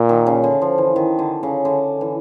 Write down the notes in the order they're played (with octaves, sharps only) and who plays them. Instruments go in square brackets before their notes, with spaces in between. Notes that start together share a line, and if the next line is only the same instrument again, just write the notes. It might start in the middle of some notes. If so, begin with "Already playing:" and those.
Already playing: [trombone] A#2
[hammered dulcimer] D#3
C#3
D3
F3
E3
D#3
D3
C#3
D3
E3